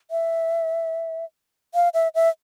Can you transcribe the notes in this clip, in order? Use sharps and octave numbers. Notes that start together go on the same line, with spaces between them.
E5
F5
E5
E5